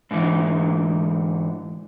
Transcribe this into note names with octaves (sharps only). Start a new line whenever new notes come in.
G#2 D3 E3